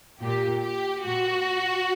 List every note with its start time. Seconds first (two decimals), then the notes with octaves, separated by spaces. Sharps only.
0.21 A#2 G4
0.63 G4
1.04 A#2 F#4